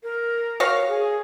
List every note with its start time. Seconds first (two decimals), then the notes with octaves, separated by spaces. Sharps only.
0.03 A#4
0.60 F#4 C#5 F5
0.88 G#4